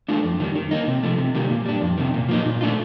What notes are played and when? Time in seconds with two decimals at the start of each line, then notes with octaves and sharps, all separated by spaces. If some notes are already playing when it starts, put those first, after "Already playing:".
0.09 A3 D4 F4
0.24 F2
0.40 D#3 G3
0.55 D#3
0.71 A#3 D#4
0.87 C3
1.03 F3 A3
1.18 C3
1.35 D#3 G3 A#3
1.50 A#2
1.66 G3 D4
1.81 F2
1.98 C3 D#3
2.14 A#2
2.29 F3 A#3 D#4
2.46 A#2
2.61 A3 D4 F4